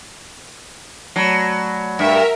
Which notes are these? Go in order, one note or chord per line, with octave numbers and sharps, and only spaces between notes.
F#3 A3 D5 B5
G2 A#4 E5